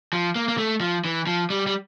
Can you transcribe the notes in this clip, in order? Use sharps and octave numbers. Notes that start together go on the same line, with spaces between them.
F3
A#3
A#3
A3
F3
E3
F3
G3
G3